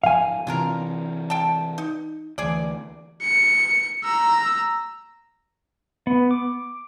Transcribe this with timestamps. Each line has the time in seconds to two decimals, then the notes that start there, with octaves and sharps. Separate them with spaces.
0.04 G#2 F3 F5 G#5
0.47 C3 E3 C4 D4 F4 A#4
1.30 G5 A5
1.78 D#4
2.38 D2 E3 G#4 D5
3.22 C#7
4.04 A#5 E6
6.07 B3
6.31 D6